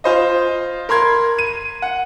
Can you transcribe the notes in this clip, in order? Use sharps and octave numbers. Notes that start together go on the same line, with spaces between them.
F4 C5 D#5
A#4 B5 C6 G#6
D#7
F#5